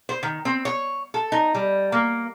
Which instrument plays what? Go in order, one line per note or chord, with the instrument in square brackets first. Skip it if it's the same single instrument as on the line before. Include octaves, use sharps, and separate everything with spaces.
[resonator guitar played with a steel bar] C5
D#3
C4
C#5
A4
D#4
G3
A#3